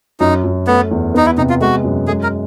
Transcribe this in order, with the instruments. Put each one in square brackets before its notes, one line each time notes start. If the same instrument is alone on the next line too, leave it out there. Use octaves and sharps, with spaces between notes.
[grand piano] F#2 [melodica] D#4
[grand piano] F#2
[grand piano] A3 [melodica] B3
[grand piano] E2
[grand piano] B3 [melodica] D#4
[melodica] E4
[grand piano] C3 [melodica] D#4
[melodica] F4
[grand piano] G#3 [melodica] F#4
[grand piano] F#2
[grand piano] G#3 [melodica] G#4
[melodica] A#4